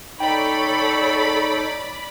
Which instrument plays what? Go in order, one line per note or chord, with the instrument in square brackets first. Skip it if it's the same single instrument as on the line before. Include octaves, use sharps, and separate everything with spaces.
[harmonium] D#4 [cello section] A4 C#5 [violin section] D5 B5 [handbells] G5